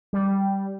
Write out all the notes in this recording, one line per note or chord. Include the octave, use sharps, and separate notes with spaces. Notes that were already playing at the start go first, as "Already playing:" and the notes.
G3